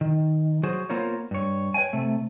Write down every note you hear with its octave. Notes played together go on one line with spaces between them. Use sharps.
D#3
F#3 F#4 G#4 C5
A#3 B3 F4 A#4 C5 C#5
G2 C#5
B4 C#5 E5 G5 G#5
C3 A3